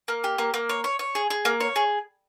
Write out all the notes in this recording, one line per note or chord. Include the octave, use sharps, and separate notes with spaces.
A#3
G4
A#3
A#3
C#5
C#5
C#5
G#4
G#4
A#3
C#5
G#4